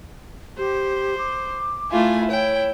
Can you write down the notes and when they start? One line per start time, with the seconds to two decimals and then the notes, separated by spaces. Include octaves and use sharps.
0.58 G4 C5
1.18 D6
1.91 A3 E4 F4 G#5
2.30 E4 C#5 G5